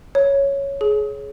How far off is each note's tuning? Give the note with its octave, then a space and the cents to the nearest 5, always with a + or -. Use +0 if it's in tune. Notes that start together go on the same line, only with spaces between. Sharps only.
C#5 +0
G#4 +20